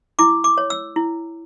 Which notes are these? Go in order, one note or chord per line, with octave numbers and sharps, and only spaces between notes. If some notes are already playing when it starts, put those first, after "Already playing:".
E4 D6
D6
C#5
E6
E4